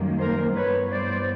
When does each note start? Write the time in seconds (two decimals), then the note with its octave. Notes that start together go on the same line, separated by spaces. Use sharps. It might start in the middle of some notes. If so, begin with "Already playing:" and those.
Already playing: F#2 D#3 G3 A#3
0.20 A#4 C5
0.56 G2 E3 G3 B3 B4 C#5
0.90 C5 D5